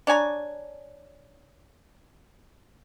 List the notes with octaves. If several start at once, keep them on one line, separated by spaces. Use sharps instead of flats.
D4 C#5 G#5 A#5